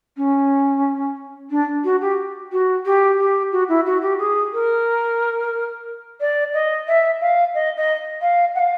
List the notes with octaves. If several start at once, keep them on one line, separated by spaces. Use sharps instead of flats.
C#4
D4
F#4
G4
F#4
G4
G4
F#4
E4
F#4
G4
G#4
A#4
D5
D#5
E5
F5
D#5
D#5
F5
F#5
F5